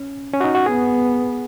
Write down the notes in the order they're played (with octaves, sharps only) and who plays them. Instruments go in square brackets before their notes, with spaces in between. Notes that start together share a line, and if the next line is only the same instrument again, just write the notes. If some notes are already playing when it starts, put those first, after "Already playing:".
Already playing: [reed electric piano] C#4
C#4
F#4
D#4
F#4
[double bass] B3 [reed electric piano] G#4